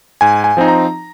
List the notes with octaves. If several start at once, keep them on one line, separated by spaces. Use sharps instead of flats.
G#2 G#5
G#5
F3 C4 D#4
A#5